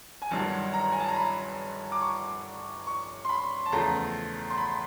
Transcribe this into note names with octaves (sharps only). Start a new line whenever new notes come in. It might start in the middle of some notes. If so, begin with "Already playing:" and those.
G#5
G1 G2 D#3 F#3 A5
A#5
G#5
A5
A#5
B5
D6
C#6
C#6
C6
B5
A5
E2 C#3 F3 A3 A#5
C6
B5